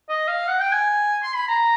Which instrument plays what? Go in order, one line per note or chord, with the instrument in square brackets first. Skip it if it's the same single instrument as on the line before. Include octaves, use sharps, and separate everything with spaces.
[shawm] D#5
F5
F#5
G5
G#5
C6
B5
A#5